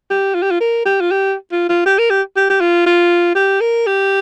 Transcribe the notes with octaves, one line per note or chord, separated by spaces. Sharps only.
G4
F4
G4
F4
A#4
G4
F4
G4
F4
F4
G4
A#4
G4
G4
G4
F4
F4
G4
A#4
G4